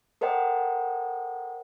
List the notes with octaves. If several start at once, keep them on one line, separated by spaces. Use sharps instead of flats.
A4 A#4 C5 D#5 F#5 G5